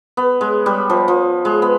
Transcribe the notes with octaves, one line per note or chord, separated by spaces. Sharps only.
B3
G#3
G3
F3
F3
G#3
B3